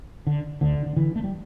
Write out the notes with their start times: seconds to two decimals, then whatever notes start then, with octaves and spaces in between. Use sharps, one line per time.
0.27 D3
0.61 D2 D3
0.86 D3
0.97 D3 E3
1.16 A3
1.24 G3